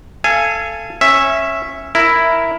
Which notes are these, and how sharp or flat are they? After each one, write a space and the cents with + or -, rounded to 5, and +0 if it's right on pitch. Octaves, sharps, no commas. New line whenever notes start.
A4 +0 F5 -35 G#5 +0
C#4 -15 E5 +0
E4 +0 A#4 +0